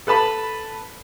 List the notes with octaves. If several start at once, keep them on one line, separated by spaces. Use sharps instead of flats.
A4 B4 A5 B5